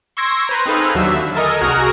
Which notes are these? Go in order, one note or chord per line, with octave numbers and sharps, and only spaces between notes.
C6 C#6 E6 G#6 A#6 D7
B4 C5 A#5
C4 D#4 G#4 A4 B4 F5
D#2 D3 F#3 E5
A4 A#4 D#5 G#5
C2 F#4 G#4 A#4 A#5 F6